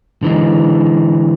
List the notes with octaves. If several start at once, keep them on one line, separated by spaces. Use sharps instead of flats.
D3 E3 G#3